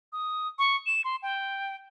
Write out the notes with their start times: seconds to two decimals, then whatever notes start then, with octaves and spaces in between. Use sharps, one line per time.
0.13 D#6
0.59 C#6
0.86 E7
1.04 C6
1.23 G5